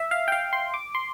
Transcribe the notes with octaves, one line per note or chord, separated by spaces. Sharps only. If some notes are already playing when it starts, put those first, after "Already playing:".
Already playing: E5
F5
G5
F5
C6
D6
C6